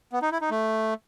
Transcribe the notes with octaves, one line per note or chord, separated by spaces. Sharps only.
B3
D#4
E4
D#4
A3